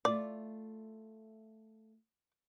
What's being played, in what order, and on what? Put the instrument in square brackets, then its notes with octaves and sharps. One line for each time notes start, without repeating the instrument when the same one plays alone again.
[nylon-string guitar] A3 F4 [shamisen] D5